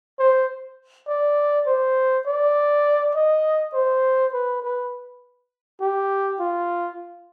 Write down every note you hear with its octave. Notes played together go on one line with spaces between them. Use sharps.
C5
D5
C5
D5
D#5
C5
B4
B4
G4
F4